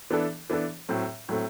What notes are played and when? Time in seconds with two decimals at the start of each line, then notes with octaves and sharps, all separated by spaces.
0.10 E3 B3 D4 A4
0.50 E3 B3 D4 A4
0.89 A2 F#3 A3 C4
1.29 A2 F#3 A3 C4